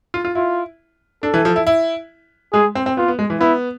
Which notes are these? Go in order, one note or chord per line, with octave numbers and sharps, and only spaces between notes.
F4
F4
E4 F4
D4 A4
E3
F3
E4
E4
G#3 G#4
C4
C4
B3 F4
B3
G#3
E3
B3 E4